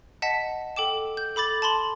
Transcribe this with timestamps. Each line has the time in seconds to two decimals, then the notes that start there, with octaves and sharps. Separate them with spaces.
0.22 D#5 F#5 A5 B6
0.76 A4 G5 D6 E7
1.17 G6
1.36 A4 B5 D6 A6 F#7
1.62 A5 B5 C6 F#7